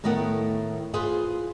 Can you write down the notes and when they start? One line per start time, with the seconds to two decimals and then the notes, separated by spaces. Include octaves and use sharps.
0.04 A2 D#3 A3 B3 A#4 F#5
0.94 F4 G#4 B4 C5